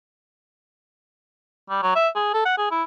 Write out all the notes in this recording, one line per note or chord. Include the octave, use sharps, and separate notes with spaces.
G3
F#3
E5
G#4
A4
F#5
G#4
E4